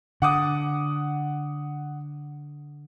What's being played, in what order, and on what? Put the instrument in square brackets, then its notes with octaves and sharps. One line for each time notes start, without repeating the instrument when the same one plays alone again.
[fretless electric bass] D3 [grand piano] F#5 D6 D#6